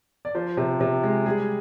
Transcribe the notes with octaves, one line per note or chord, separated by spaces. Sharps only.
D5
F3 C5
C3
C3
G#3
G3 G#4